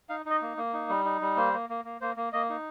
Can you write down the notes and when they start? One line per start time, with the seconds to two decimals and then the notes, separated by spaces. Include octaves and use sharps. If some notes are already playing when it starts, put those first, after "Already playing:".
0.09 D#4 F5
0.26 D#4 D#5
0.42 A#3
0.57 A#3
0.73 D#4
0.89 G3
1.05 D#4
1.21 G3
1.37 A#3 C5
1.53 A#3
1.70 A#3
1.85 A#3
2.01 A#3 C5
2.17 A#3
2.33 A#3 D#5
2.49 D#4